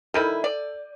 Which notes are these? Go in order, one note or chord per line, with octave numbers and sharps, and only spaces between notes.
D#3 G3 E4 A4 G6 D#7
D5